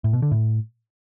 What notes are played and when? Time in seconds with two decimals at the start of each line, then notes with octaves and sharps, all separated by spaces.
0.04 A2
0.13 B2
0.22 D3
0.31 A2